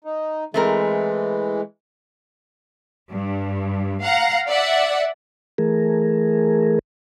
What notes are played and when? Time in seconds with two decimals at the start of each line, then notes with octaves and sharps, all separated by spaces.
0.04 D#4
0.54 E3 G#3 A3 C4 A#4
3.10 G2
4.02 F5 F#5 A#5
4.48 D5 E5 F#5
5.58 E3 A3 G#4 A#4